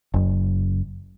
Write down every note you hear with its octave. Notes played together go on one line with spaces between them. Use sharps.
F#1 F#2